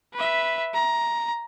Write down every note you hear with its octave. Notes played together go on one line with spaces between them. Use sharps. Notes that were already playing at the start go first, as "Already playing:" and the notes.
B4 E5
A#5